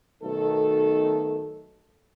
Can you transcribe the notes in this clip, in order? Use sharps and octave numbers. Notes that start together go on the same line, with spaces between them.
B1 D#3 A3 A4